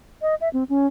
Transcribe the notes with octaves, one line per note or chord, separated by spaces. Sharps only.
D#5
E5
C4
C#4